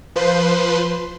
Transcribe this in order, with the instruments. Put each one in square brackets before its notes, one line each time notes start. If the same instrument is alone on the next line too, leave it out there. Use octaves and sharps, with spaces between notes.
[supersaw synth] F3 B4 C5 C6